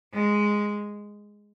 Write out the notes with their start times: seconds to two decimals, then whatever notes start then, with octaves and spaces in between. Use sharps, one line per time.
0.13 G#3